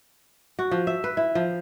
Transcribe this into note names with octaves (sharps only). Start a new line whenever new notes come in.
F#4
F3
E5
B4
E4
F3